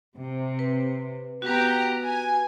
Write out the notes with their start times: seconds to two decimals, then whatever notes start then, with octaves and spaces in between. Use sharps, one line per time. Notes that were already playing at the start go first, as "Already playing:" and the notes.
0.15 C3
0.59 B4
1.42 B3 F#4 G4 B4 A#5
2.03 G#5